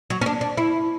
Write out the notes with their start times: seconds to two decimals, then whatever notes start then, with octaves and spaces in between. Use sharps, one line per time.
0.10 F#3
0.21 C#4
0.26 D4
0.41 D4
0.57 E4